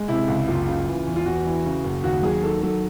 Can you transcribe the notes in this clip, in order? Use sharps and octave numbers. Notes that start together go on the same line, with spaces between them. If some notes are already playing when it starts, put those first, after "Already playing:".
Already playing: G#3
C3 E4
C#2
F#1 F4
C#3
E3
E2
F4
E2 F#4
E3
C#3
F#1
D#2 F#4
F#3 G#4
D#3 A4
F#3 A4